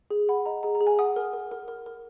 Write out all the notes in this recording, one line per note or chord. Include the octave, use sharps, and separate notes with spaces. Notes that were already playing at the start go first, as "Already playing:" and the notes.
G#4
F#5 B5
D#5 A#5
G#4 A#5
A#5
G#4
G#5
F#5 D#6
A#4
A#4
A#4
A#4
A#4